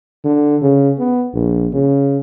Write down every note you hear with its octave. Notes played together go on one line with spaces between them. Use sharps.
D3
C#3
B3
A#1
C#3